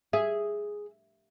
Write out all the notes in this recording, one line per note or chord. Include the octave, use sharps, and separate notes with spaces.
G#4 E5